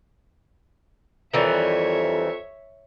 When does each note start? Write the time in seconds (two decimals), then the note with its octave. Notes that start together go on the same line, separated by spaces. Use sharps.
1.33 F2 D#3 E3 G3 C#5 E5